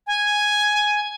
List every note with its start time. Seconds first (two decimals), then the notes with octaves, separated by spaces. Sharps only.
0.07 G#5